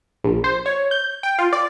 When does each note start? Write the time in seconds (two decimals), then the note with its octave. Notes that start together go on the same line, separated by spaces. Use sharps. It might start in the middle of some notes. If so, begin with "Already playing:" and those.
0.24 A#1
0.44 C5
0.66 C#5
0.91 G6
1.23 G5
1.39 F4
1.53 D5